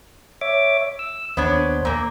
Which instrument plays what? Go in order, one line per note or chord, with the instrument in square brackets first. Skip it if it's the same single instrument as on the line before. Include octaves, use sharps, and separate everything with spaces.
[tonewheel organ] C#5 E5 D6
E6
[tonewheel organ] D#2 C5 [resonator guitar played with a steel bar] B3 D4 C#5
[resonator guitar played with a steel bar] A#2 A#3